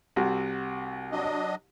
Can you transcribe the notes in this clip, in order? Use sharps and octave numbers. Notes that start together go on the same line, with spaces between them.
C2 C3 F#4
F#3 D4 D#5